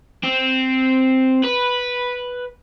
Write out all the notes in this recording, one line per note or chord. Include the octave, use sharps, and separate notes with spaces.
C4
B4